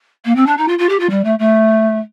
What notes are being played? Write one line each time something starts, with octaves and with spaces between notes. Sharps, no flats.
A#3
C4
D4
D#4
F4
F4
G4
F4
G3
A3
A3